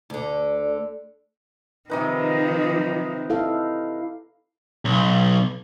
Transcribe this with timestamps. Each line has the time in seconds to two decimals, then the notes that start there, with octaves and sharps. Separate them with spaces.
0.10 D2 D3
1.90 C3 D#3 F3 D#4 B4
3.30 E4 A4 F5
4.85 B1